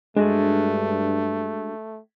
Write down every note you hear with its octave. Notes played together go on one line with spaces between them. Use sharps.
G2 G#3 A3 D4 F#4 G#4